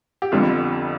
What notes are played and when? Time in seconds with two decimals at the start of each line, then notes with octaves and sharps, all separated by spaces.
0.22 G4
0.32 G1 F2 D3 G3 F4